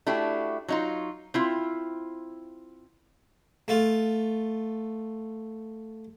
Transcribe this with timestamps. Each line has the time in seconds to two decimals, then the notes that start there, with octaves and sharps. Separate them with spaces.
0.06 A3 D4 E4 F#4 G4
0.68 F#3 D#4 F4
1.34 C4 E4 F4
3.68 A3 F4